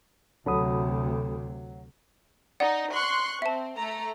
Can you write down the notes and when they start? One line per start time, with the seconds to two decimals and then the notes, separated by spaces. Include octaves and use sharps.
0.46 D2 C3 F#3 A4 B5 D#6
2.60 D#4 D5 F#5
2.92 C6 C#6 F#6
3.42 C4 E5 A5
3.76 A3 A#5